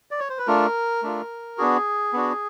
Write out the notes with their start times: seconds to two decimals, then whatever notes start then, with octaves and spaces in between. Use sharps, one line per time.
0.11 D5
0.19 C#5
0.30 C5
0.38 B4
0.47 A3 D4 F4 A#4
1.03 A3 D4 F4
1.58 B3 D4 F#4 G#4
2.13 B3 D4 F#4